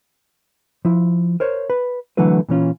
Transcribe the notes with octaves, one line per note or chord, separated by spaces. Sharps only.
F3 E4
A#4 C5 C#5
B4
D3 E3 F#3 A3 E4 B4
A#2 E3 C#4 F4